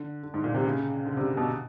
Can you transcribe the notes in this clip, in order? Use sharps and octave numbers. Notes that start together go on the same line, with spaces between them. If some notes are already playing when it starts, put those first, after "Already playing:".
Already playing: D3
D3
G#2
A#2
C3
C#3
D3
C3
B2